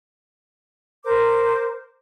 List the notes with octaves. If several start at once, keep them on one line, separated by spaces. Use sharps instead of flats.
A#4 C5 D6